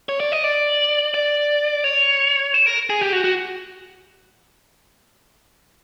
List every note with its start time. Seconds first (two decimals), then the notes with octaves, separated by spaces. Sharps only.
0.09 C#5
0.20 D5
0.32 D#5
0.44 D5
1.14 D5
1.84 C#5
2.54 C5
2.66 A#4
2.90 G#4
3.01 G4
3.13 F#4
3.24 F#4